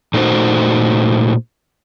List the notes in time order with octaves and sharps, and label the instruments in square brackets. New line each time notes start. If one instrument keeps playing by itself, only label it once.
[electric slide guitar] A#2 A3 D4 D#4 F#4 C5